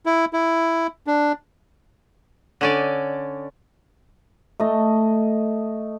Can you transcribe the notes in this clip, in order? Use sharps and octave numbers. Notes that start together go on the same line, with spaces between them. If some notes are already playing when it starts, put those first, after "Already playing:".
E4
E4
D4
D3 C#4 D5
A3 D#5